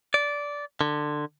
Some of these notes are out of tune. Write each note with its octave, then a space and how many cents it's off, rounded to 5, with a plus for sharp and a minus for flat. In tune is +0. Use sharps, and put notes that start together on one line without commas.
D5 -15
D3 +20